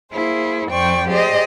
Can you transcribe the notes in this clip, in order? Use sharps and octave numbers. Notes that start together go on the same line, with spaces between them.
A#3 E4 G#4 C5
F2 C5 D5 G5 C#6
G4 G#4 C5 D5 D#5